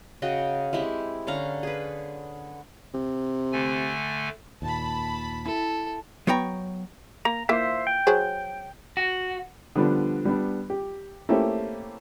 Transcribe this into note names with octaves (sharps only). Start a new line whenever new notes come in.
C#3 F#4 D#5 G5
G#3 C4 E4 G4
D3 C#4 F5 A#5
G#4 B4
C3
D3 A3 G#5
D#2 A#2 A5 B5
E4 A4
F#3 B3 C#5 G5 A#5
A#3 A#5
E3 A#3 F4 C5 E5
G5
F#3 G#4 C5
F#4
D3 F3 G3 B3 D4
G3 B3 D4
G4
A3 A#3 C4 C#4 E4 G4